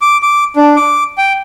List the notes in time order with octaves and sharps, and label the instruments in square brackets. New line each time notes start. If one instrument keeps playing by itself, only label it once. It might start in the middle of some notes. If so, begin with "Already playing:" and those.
[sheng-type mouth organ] D6
D6
D4
D6
G5